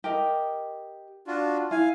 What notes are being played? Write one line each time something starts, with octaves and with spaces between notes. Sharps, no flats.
G4 A#4 D#5
D4 F4 F#4
E4 F5 G#5